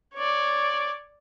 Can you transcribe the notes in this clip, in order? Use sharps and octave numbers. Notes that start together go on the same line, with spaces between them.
C#5 D5